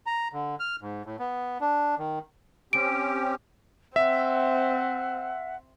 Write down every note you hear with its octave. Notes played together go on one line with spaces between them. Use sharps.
A#5
D3
F6
G#2
A2
B3
D4
D#3
C4 C#4 G4 D7
C4 E5 F#5